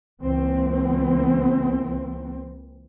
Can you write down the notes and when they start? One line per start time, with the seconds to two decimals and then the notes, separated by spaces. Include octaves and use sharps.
0.21 C#2 E3 A#3 C4